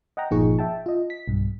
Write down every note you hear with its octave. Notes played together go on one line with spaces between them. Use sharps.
D#5 F#5 G5 A#5
G1 A#2 F3 D#4 G#4 C#6
E5 G5 A5
F4 D#5
B6
B1 G2